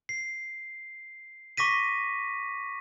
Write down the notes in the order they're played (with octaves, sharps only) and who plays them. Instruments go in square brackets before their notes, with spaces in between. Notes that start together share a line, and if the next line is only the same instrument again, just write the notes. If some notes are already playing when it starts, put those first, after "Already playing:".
[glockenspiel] C7
C#6 D6 A#6 B6 D#7